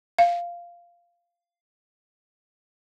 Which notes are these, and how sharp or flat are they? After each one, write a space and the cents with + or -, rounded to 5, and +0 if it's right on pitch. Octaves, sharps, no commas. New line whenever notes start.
F5 -5